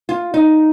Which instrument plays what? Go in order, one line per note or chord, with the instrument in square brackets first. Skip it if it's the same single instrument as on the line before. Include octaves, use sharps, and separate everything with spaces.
[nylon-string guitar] F4
D#4